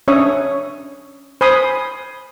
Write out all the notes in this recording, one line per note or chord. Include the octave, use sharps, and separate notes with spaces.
C#4 D4 C#5 E5 D#6
C5 G#5 B5 C6 D#6